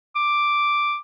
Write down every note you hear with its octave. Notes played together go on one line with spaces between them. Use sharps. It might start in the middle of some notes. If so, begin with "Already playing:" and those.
D6